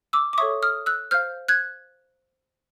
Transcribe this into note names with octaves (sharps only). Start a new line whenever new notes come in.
D6 E6
D6
A4 C#5 E5 C#6 D#6
D#6 F6
E6 F#6
C5 F5 F6 G6
F#6 G#6